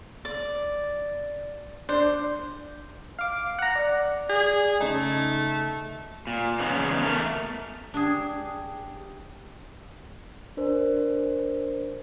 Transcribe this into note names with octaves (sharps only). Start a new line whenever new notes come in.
D5
D4 C5
F5 D6
F#5 A#5
D5
G#4
C#3 A3 D#4
A#2
E2 C#3 B3 C#4 D#4
A3 A#4
D4 G4 G#4
D4 A#4 C5